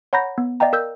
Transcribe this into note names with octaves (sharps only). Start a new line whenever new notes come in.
C#5 F#5 A#5 B5 G6 A#6
B3
D5 D#5 F5 G5 A#5
A#4 E6 G6